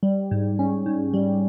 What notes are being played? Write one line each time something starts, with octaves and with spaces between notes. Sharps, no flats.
G3
G#2
C#4
G#2
G3